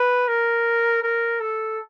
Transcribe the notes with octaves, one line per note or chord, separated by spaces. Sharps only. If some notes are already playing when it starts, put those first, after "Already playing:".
Already playing: B4
A#4
A#4
A4